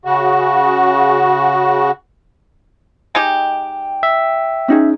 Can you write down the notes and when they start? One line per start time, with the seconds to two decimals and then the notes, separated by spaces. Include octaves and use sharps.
0.05 C#3 F#4
3.15 G#3 D#4 G4 G5
4.03 E5
4.68 C#4 D#4 G#4